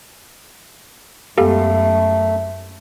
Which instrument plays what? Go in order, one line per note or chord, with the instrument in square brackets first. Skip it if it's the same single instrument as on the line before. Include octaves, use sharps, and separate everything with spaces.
[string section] F#2 [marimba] F#3 G#3 B3 [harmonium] A3 [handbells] G4 A4 F5